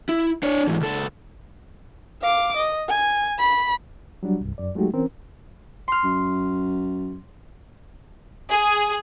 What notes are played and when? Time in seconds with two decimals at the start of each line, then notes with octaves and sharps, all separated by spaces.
0.09 E4
0.43 D4 C#5
0.67 G#2 E3
0.81 C#2 A4
2.22 F5 D6
2.57 D#5
2.89 G#5
3.39 B5
4.23 F#3 G3 D4 F#4
4.41 C2 G2
4.58 F#2 D5
4.75 F#3 G#3 A3 D#4 F#4 G4
4.94 E3 C4 C#4 A#4
5.88 C6 F6
6.04 F#2
8.50 G#4